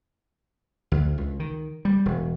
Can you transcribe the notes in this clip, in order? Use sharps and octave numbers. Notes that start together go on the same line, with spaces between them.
D2
C#2
D#3
G3
E1